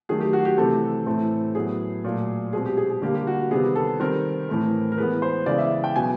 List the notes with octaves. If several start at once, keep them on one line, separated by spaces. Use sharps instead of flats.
D#3 F#3 A3 G#4
G4
F#4
G4
C3 E3 A3 C4 A4
A2 E3 A3 C4
A2 F#3 B3 G#4
A#2 F#3 A3
B2 G#3 C4 G#4
G4
G#4
G#4
D3 G3 A#3 G4
G4
F#4
C3 D#3 G3 B3 G#4
A4
D#3 G3 C4 A#4
A2 E3 A3 C4
A#4
E3 G#3 B3 B4
C5
C#3 E3 G#3 B3 D5
E5
G5
B2 F#3 B3 G#5